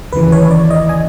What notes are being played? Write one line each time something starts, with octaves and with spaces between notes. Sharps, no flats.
D#2 C#3 E3 B4
C#5
D5
D#5
G#5